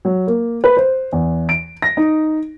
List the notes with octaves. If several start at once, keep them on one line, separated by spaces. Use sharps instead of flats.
F#3
A#3
B4
C5
E2
D7
A#6
D#4